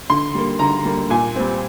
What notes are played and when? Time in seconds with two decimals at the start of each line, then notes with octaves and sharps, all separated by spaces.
0.10 D3 C6
0.35 G3 A#3
0.59 D3 A#5
0.85 G3 A#3
1.10 A#2 G#5
1.36 G3 C4